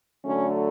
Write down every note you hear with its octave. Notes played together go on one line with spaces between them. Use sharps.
D3 F#3 A3 C#4